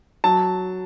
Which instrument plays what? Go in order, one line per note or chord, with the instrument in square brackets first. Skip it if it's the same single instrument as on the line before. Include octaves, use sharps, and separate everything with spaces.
[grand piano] F#3 A5